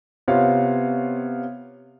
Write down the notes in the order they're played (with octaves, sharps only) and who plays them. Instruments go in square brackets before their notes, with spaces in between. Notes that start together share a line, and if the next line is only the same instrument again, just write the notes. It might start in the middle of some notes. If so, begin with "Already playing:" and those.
[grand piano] C3 B3 F4 C#5 F5